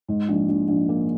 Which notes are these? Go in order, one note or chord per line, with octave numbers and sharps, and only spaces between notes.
G#2
A#1
A#1
A#1
A#3